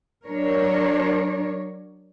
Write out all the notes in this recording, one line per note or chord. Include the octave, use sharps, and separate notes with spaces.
F#3 D4 A#4 C#5